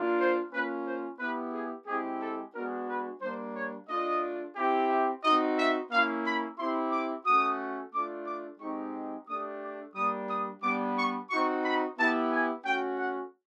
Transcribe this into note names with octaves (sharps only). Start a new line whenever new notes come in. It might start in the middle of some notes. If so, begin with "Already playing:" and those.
Already playing: A#3 D4 F4
C5
A#3 C#4 F4 B4
C5
B3 E4 G4 B4
G#4
G#3 C4 E4 G4 G#4
A4
G#3 B3 D4 F#4 A#4
B4
G3 A#3 D4 C5
C#5
A3 D4 F4 D#5
C4 E4 G4
E5
C4 D#4 F#4 D#5
E5
A#3 C#4 E4 F5
B5
C4 E4 G4 C6
D6
A3 C#4 F#4 D#6
A3 D4 F4 D6
D6
G#3 C4 D#4 G4 C#6
A3 D4 G4 D#6
D6
G3 A#3 D4 D#6
D#6
G3 B3 D4 D6
C#6
C4 D#4 F#4 C#6
B5
B3 E4 G4 A5
G#5
A3 C#4 F#4 G5
F#5